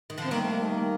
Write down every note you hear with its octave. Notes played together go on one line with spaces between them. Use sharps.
D#3
D3 F3
C4
D#3 G3 A#3
A3
A#3
A3
A#3